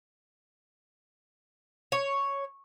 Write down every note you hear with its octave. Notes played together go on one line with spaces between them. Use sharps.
C#5